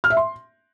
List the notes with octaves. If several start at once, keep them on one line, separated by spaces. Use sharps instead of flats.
F6
E5
C6